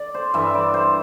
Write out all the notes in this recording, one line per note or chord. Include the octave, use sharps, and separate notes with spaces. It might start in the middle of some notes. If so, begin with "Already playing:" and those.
Already playing: D5
C5
G2 E3 E5
D5
C5